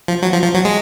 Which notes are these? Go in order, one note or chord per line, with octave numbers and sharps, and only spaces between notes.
F3
F#3
F3
F3
F#3
G#3